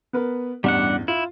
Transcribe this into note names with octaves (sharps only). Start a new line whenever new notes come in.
B3 A#4 B4
A1 E2 G2 G3 D4 F#5
E4 F4